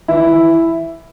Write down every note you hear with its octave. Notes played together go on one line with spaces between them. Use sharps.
E3 E4
E3